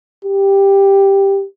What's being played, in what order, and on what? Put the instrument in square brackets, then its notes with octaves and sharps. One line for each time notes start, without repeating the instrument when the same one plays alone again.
[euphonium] G4